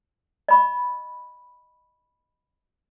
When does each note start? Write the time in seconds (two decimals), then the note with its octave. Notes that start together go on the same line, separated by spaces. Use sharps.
0.48 D#5 B5 C#6